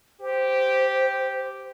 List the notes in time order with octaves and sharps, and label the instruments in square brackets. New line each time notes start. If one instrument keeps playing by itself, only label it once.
[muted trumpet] G4 [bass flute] C5